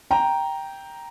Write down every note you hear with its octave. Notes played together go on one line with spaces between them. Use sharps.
G5 A#5